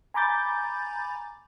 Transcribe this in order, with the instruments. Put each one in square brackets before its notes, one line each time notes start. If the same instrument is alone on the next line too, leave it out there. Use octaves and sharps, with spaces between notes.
[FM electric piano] G#5 A#5 B5 D6 G6 A6